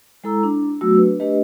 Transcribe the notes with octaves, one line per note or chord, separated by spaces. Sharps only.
G#3 E4 A4 A#5 E6
D4
F#3 A3 B3 F#4 E6
D4 B4
A3 D4 G4 B4 D#5